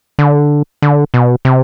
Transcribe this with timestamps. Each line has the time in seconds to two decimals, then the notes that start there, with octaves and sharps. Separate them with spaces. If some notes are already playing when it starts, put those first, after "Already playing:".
0.19 D3
0.82 D3
1.14 B2
1.45 C3